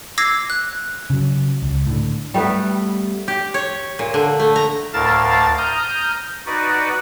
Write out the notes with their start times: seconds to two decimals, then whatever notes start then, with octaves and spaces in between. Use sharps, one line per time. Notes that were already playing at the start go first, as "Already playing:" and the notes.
0.18 D6 E6 G#6 A#6 C7
0.50 F#6
1.10 C#3 F#3
1.63 C#2
1.87 A2 D3
2.34 G3 A3 B3 B4
3.28 G4
3.54 C#5
3.99 A#2
4.14 D3
4.40 A3
4.56 A#5
4.93 D2 A2 A#4 F5 A5 A6
5.58 A#5 D#6 F6 G6
6.46 D#4 F#4 B4 D5 F#5